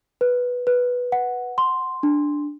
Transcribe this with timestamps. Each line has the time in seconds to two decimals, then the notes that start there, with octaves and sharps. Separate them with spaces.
0.21 B4
0.67 B4
1.12 F#5
1.58 C6
2.03 D4